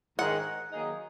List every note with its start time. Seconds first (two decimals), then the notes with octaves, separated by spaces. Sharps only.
0.18 G#2 D#3 G#3 F#5
0.72 D#3 F#3 A#3 D#4 G#4